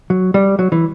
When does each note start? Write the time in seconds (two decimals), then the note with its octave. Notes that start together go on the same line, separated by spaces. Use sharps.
0.10 F#3
0.34 G3
0.59 F#3
0.72 E3